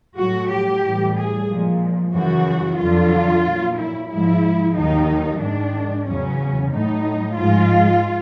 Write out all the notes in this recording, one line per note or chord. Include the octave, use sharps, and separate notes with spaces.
A2 F#3 F#4
G4
A2 E3 G3
G#4
A#2 F3 G#3
F#2 C#3 E3 F#4
F2 D3 F#3 F4
A#2 F#3
E4
G#2 F3 G#3 E4
D#2 D#3 F#3 D#4
G#2 D#3 G#3 D4
E2 C#3 F#3 C#4
A2 F#3 D#4
G#2 F3 G#3 F4